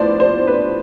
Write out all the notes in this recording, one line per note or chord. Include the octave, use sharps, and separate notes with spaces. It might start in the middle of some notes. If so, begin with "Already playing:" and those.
Already playing: A2 F3 B3 D4 C5 D5
C5
B4